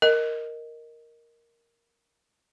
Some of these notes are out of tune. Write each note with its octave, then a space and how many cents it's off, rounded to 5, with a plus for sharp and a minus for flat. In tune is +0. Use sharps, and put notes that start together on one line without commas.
A#4 +0 D#5 +0